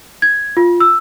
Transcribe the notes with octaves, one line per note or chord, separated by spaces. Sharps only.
G#6
F4
E6